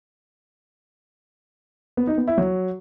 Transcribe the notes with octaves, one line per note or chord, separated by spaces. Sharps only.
B3
D#4
B3
E4
F#3